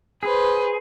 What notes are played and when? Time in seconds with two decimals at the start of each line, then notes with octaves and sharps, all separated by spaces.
0.23 G#4 B4 C5